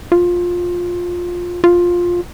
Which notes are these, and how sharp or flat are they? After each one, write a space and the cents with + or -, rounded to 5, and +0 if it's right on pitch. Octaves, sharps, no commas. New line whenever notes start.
F4 +15
F4 +10